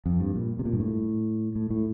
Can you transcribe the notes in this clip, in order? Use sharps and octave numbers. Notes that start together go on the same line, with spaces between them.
F2
G2
A#2
C3
A#2
G2
A2
A2
A2